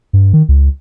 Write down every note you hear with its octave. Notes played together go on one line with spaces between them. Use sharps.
G2
D#3
C#2